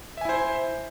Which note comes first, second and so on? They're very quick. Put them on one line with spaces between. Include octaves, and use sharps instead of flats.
E5 G#5 E4 C5